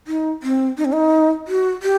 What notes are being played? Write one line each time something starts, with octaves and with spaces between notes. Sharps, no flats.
D#4
C4
D#4
C4
D#4
F#4
G4